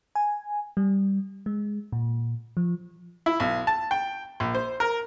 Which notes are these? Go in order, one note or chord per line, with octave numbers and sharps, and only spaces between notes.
G#5
G3
G#3
A#2
F3
E4
B1
A5
G5
A#1
C5
A#4